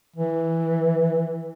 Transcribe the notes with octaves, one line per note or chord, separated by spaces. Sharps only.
E3